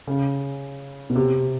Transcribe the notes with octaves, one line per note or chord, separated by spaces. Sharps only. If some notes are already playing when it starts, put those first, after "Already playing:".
C#3
B2
C3